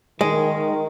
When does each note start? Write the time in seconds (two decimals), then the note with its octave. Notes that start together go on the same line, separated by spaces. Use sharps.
0.21 D#3 G#3